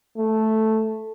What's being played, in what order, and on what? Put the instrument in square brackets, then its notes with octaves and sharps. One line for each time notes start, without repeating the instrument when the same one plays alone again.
[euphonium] A3